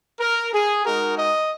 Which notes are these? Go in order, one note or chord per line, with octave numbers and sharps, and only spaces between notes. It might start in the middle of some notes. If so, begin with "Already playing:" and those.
A#4
G#4
G#3 D#4 F#4 A#4
D#5